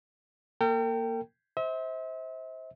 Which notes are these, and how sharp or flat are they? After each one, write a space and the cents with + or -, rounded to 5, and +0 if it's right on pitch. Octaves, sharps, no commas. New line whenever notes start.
A#3 +0 A#4 -45 G5 +0
C5 +5 E5 -40